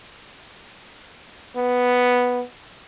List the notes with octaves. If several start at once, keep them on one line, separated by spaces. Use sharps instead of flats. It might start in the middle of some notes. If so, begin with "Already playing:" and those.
B3